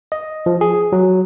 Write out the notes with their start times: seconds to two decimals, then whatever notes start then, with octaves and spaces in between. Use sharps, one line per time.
0.12 D#5
0.46 F3
0.61 G#4
0.92 F#3